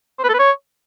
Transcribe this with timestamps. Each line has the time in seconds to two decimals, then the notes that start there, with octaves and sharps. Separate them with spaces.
0.19 C5
0.24 B4
0.29 A4
0.34 B4
0.39 C#5